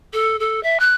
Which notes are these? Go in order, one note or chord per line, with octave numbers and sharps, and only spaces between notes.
A4
A4
E5
F#6